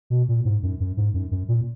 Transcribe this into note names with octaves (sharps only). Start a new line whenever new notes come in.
B2
A#2
G#2
F#2
F#2
G#2
F#2
F#2
A#2